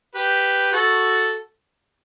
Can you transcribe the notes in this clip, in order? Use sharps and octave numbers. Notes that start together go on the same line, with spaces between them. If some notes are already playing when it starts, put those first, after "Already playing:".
G4 B4
F#4 A4